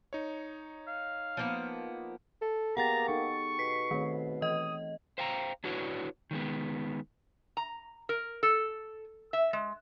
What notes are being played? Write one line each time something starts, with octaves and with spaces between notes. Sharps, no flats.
D#4 C#5
F5
F3 A#3 B3
A4
A#3 B3 G4 G#4 F#5 G5 A#5 A6
D#4 A4 C#6
B2 B6 C7
D#3 A3 C4 C#5
E3 D#5 D#6
C5 F5 G5 A5 A#5
D4 E4 F#4 B4 C#5 D5
D#3 G#3 B3
A#5
A#4
A4
E5
G#3